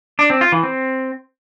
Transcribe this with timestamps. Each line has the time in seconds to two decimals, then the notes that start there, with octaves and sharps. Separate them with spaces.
0.19 D4
0.30 C4
0.41 F4
0.52 E3
0.63 C4